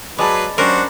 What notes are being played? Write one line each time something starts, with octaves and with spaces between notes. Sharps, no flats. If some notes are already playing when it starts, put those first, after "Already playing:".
F#3 G#3 G#4 B4 D5 A5 B5
D#2 F#3 C#4 D4 F#4 A#4 C5